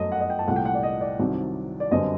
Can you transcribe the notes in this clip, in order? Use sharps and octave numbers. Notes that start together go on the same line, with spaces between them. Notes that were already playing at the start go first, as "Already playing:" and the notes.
Already playing: G1 F#2 F#3 A3 D#5
F#5
D#5
G5
A5
C2 A#2 A3 F#5
G5
F#5
D5
D#5
D5
C2 C3 D#3 F#3
D5
G1 F#2 D3 G3 C4 D#5